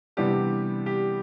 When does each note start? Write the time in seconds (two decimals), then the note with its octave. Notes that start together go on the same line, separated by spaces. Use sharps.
0.17 C3 E3 G3 B3 D4 G4
0.86 G4